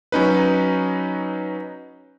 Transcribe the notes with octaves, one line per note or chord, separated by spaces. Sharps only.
F#3 C#4 D#4 B4